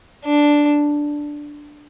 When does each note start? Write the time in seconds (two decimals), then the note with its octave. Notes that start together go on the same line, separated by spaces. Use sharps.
0.25 D4